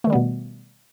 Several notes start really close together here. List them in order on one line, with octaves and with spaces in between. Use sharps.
A3 D#3 G3 B3 B2